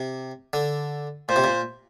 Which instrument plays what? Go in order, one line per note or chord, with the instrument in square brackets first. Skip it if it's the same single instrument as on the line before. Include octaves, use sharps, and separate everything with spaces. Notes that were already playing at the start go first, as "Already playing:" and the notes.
Already playing: [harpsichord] C3
D3
[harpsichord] A#2 [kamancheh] C5
[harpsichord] C3
A#2